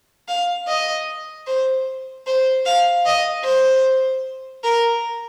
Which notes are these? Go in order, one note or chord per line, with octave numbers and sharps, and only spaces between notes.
F5
D#5
C5
C5
F5
D#5
C5
A#4